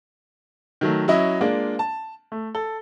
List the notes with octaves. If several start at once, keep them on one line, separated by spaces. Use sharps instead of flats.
D#3 F#3 A3
F#3 C#4 E4 D#5 E5
G#3 A#3 D4 F4
A5
A3
A4